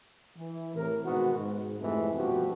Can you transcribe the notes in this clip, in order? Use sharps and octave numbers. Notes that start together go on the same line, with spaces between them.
E3
A2 C3 A#4
G#2 B2 D#3 B3 F#4
G#2
F2 C3 E3 G#3 A3
G2 B2 F3 F#4 G4